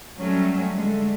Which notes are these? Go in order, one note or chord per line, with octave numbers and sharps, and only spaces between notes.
F#3 G3 A3 C#4
D3 G#3 A3